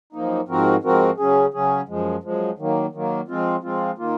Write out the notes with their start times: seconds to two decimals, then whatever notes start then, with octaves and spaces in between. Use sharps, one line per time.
0.13 F#2 F3 A#3 D#4
0.48 G#2 F3 C4 F#4 A#4
0.83 G#2 F3 C4 F#4 A#4
1.18 C#3 F#3 C#4 G#4
1.53 C#3 F#3 C#4 G#4
1.88 F#2 F3 G#3
2.23 F#2 F3 G#3
2.58 D#3 F#3 A#3
2.93 D#3 F#3 A#3
3.28 F3 G#3 C4 F4
3.63 F3 G#3 C4 F4
3.98 D#3 A#3 F4